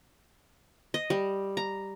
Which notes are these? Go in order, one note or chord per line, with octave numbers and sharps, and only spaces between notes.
D#5
G3
A#5